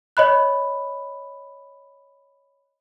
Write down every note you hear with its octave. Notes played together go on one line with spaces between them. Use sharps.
C#5 D#5 B5 F#6